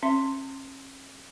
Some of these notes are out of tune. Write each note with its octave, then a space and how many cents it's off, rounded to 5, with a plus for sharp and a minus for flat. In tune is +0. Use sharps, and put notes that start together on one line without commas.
C#4 -40 E5 +20 C6 +0